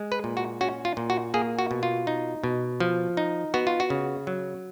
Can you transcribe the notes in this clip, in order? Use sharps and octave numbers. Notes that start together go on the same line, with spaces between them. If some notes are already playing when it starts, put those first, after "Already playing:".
Already playing: G#3
B4
A#2
F#4
C#4 F#4
F4
A#2
F#4
A#3 G#4
F#4
B2
F4
D#4
B2
F3
D#4
B3 F#4
F4
F#4
C#3
F#3